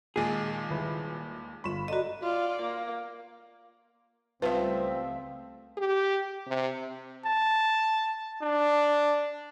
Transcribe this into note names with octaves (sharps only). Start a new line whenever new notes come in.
D#2 A#2 G#3 D#4 G#4
D#1 E4 B4
G1 F4 B5 C#6 E7
F#4 A4 D5 D#5 A#5
F4 D5
A#3
C#2 F3 G3 A3 C4 B4 E5
G4
C3
A5
D4